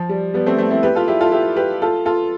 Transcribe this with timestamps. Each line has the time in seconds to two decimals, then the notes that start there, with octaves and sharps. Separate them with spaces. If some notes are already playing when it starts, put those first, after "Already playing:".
Already playing: F3
0.09 G3
0.34 G3 B3
0.46 A3 C4
0.58 A3 C4
0.71 C4 E4
0.83 G4 B4
0.95 F4 A4
1.08 E4 G4
1.21 F4 A4
1.32 E4 G4
1.56 G4 B4
1.82 F4 A4
2.06 F4 A4